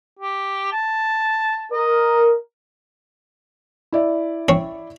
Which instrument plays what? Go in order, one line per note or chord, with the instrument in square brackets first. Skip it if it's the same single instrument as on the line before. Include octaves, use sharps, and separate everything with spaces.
[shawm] G4
A5
[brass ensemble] A#4 [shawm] D#5
[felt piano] E4 D5 E5
[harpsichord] C4 C#4 C#5